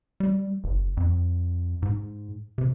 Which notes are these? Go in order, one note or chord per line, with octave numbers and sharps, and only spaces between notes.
G3
F#1
F2
G#2
C3